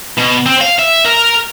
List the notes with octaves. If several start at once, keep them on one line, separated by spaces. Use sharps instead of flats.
B2
C4
F5
E5
A#4